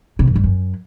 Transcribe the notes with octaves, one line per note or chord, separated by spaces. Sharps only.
C3
F#2
G2
F#2